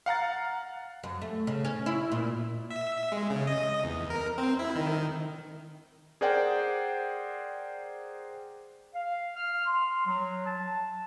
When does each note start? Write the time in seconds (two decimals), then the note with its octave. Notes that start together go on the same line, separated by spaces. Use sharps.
0.06 F5 F#5 A#5 A6
1.04 F#2
1.22 A3
1.47 C#3
1.65 C#4
1.86 E4
2.12 A#2
2.70 E5
3.12 G#3
3.30 C#3
3.47 D#5
3.84 E2
4.10 A#4
4.38 C4
4.59 E4
4.75 D#3
6.21 G#4 A#4 C5 D5 F#5 G5
8.94 F5
9.37 F6
9.66 C6
10.06 F#3
10.46 A5